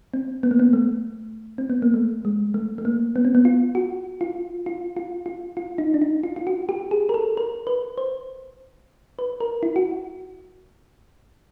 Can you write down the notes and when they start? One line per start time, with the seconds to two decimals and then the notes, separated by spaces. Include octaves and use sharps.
0.14 C4
0.43 B3
0.51 A#3
0.60 B3
0.73 A3
1.58 C4
1.70 B3
1.82 A#3
1.94 A3
2.25 G#3
2.54 A3
2.78 A3
2.85 A#3
3.16 B3
3.25 C4
3.35 B3
3.45 F4
3.75 F#4
4.21 F4
4.66 F4
4.97 F4
5.26 F4
5.57 F4
5.78 D#4
5.94 D4
6.02 D#4
6.23 F4
6.36 F4
6.47 F#4
6.69 G4
6.91 G#4
7.09 A#4
7.14 A4
7.37 A#4
7.67 B4
7.98 C5
9.19 B4
9.40 A#4
9.63 E4
9.76 F#4